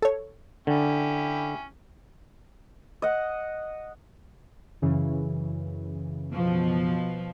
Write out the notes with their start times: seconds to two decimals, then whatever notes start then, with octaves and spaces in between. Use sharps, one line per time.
0.02 A4 C#5
0.67 D3 C#4 E4 G4
3.02 D#5 F#5
4.82 F#2 C#3 E3
6.32 B2 F3